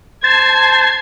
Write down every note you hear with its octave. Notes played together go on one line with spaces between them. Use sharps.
C5 A5 G#6 C7